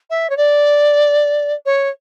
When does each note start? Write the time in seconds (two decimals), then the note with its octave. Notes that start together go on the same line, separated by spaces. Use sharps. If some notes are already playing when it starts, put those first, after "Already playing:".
0.10 E5
0.29 C#5
0.37 D5
1.65 C#5